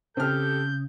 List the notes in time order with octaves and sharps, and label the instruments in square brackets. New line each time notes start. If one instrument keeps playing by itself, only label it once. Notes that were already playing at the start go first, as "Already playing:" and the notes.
[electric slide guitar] C#3 [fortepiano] C4 F6 [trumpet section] G4 A4 [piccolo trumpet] G6